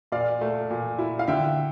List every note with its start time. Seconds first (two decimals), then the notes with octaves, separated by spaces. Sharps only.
0.12 A#2 D5 F5
0.41 A3
0.70 A#2
0.99 E4
1.19 F5
1.28 D3 E5 G5